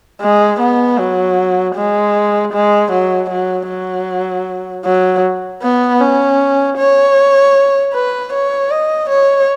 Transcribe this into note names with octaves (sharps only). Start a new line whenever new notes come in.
G#3
B3
F#3
G#3
G#3
F#3
F#3
F#3
F#3
B3
C#4
C#5
B4
C#5
D#5
C#5